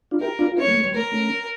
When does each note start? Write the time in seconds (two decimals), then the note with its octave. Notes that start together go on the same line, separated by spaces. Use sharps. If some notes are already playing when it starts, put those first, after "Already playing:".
0.11 D4 F4
0.21 E4 G4 A#4
0.39 D4 F4
0.52 F4
0.57 C#4 E4 C#5
0.67 G3 A#3
0.75 A3
0.84 G3
0.94 A3 A#4
1.12 A3 C#4